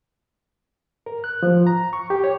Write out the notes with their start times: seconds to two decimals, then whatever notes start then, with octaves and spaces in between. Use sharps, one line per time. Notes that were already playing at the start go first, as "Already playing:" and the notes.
1.06 A#4
1.24 F#6
1.43 F3
1.67 A#5
1.93 C#6
2.10 G4
2.24 C#5